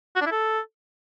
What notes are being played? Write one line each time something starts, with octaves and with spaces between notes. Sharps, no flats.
F#4
D4
E4
A4